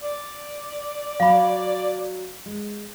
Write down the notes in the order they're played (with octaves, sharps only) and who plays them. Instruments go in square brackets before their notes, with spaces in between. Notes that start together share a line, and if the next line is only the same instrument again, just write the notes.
[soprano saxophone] D5
[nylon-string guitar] F#3 [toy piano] F5 B5
[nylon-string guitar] G#3